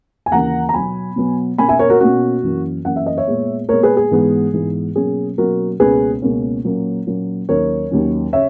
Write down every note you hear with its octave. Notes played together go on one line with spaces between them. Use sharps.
G#5
D#2 C#3 E3 A#3 F#5 A#5
A#5
B2 F#3 B3 G#5 B5
B2 F#3 B3
B2 A#3 C#4 G#5 B5
E5 G#5
A#4 C#5
F#4 A#4
B2 A#3 C#4 F#4
F#2 E3 A#3
F#2 E3 A#3 F#5
E5
D#5
C#5 E5
A#2 G#3 B3
A#2 G#3 B3 A#4 C#5
G#4 B4
G#4
G#2 E3 G#3 B3
G#2 E3 G#3 B3
B2 F#3 A#3 C#4 G#4
B2 F#3 A#3 C#4 F#4 A#4
C#2 B2 A#3 C#4 G#4 B4
C#2 B2 A#3 C#4
A#2 F#3 A#3 C#4
A#2 F#3 A#3 C#4
D#2 D#3 F#3 C#4 A#4 C#5
D#2 D#3 F#3 C#4
C#3 C#5 E5